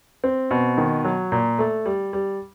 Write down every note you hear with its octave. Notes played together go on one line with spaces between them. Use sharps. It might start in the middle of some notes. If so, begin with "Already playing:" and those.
C4
B2
D#3
F#3
A#2
A3
G3
G3